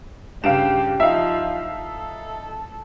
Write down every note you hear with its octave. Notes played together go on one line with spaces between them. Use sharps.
G2 C#3 G4 F5 D7 E7
F3 D#4 E4 E5 F5
A4